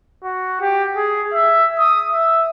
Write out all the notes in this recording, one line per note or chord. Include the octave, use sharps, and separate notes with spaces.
F#4
G4
G#4
E5
D#6
E5